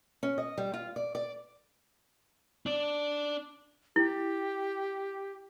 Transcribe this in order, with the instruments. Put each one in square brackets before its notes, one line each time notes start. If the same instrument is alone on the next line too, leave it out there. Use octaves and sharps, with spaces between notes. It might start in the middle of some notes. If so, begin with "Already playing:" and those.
[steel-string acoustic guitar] C#4
D#5
G3
F4
D5
D5
[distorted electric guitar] D4 D5
[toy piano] E4 [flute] G4